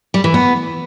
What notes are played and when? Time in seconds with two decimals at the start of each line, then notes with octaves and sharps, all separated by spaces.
0.14 G3
0.24 E3
0.34 B3